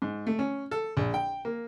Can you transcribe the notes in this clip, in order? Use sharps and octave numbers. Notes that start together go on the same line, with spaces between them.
G#2
A3
C#4
A4
A#1
G5
A#3